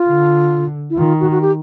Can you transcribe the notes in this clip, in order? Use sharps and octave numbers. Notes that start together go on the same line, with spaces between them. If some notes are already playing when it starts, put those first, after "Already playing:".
Already playing: F4
D3
E4
D#3 F4
F#4
F#4
G4